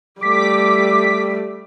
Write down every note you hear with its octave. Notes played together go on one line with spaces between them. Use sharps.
G3 A3 D6 B6